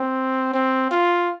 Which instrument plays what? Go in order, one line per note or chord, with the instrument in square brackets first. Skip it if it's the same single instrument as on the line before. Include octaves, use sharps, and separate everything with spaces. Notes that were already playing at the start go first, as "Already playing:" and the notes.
Already playing: [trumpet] C4
C4
F4